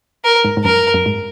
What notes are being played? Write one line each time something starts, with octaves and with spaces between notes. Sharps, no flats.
A#4
G#2
G#2
F#2 A#4
F#2
G#2